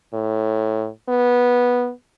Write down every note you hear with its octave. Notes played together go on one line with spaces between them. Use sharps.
A2
B3